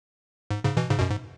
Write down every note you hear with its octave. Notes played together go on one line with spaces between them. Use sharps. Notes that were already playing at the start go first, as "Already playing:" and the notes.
G#2
G#2 C#3
B2 E3
G#2 C#3
F#2 B2
G#2